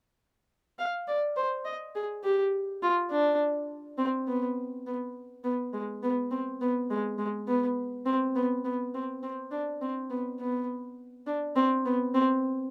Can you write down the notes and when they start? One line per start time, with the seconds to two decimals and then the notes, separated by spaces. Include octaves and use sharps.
0.79 F5
1.08 D5
1.37 C5
1.65 D#5
1.95 G#4
2.24 G4
2.83 F4
3.11 D4
3.98 C4
4.27 B3
4.87 B3
5.44 B3
5.73 G#3
6.03 B3
6.31 C4
6.61 B3
6.90 G#3
7.18 G#3
7.48 B3
8.06 C4
8.36 B3
8.65 B3
8.94 C4
9.23 C4
9.51 D4
9.81 C4
10.10 B3
10.40 B3
11.27 D4
11.56 C4
11.85 B3
12.14 C4